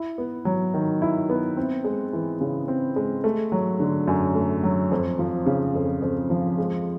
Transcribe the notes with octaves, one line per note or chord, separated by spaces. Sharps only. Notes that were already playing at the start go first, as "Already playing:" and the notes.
Already playing: E4
B3
F#3
D#3
E4
B3
C4
G#3
E3
C#3
C4
G#3
A3
F#3
D3
F#2
A3
F#3
F2
F3
C#3
F2
F2
F3
G#3